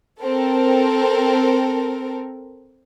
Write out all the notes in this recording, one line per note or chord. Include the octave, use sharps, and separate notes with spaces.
C4 A4 A#4